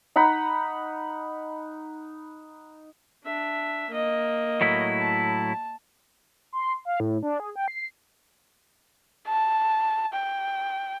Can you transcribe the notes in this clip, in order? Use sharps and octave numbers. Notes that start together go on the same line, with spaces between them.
D#4 F#5 A#5 B5
D4 E5
A#3 D#5
A2 F#3 E4
A5
C6
F5
A2
D4
G#4
G5
C7
A5
G5